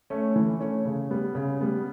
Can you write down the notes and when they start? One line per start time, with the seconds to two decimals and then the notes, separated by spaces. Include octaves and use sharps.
0.10 A3 C#4
0.36 E3
0.60 A3 C#4
0.85 C#3
1.10 G3 B3
1.35 C#3
1.61 G3 B3